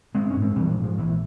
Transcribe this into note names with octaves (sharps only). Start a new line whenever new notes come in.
G#1 G#3 C4
C#4
G#2
G#3 C4
A#1 E3 G3
F3
G#2
F3
A#1 E3